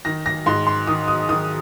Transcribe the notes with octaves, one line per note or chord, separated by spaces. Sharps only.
D#3 A#6
A#6
G#2 C6
C6
D#3 D#6
D#6
D#3 D#6